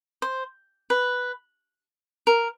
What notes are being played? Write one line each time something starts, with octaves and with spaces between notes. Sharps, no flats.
C5
B4
A#4